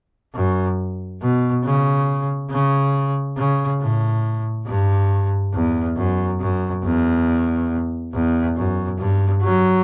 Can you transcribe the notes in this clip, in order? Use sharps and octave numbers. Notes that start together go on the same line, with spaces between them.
F#2
B2
C#3
C#3
C#3
A2
G2
E2
F#2
F#2
E2
E2
F#2
G2
F#3